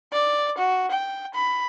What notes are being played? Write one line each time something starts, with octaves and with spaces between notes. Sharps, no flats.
D5
F#4
G5
B5